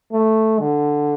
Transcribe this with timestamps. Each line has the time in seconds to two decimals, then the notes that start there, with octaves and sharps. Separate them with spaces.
0.12 A3
0.60 D3